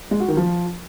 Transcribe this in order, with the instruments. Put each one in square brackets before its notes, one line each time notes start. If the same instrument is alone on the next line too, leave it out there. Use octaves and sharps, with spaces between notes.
[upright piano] G#3
F#4
D#3
F3